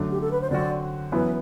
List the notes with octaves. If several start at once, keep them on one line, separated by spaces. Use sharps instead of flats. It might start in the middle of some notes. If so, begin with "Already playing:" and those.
Already playing: F#2 D3 A3 D4
G4
A4
B4
C5
D3 F#3 C4 F#4 D5
F#2 E3 B3 E4 B4